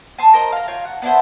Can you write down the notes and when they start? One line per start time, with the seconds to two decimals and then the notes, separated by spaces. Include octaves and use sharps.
0.18 G#5 A5 C6 D#6
0.33 A#4 C5 D#5 A#5
0.52 F5 A#5
0.68 F4 C#5 G5
0.85 F#5
1.02 B3 D4 E4 C5